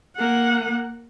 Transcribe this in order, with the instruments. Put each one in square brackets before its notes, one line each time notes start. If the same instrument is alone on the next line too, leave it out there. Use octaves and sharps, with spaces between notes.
[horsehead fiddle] A#3 F#5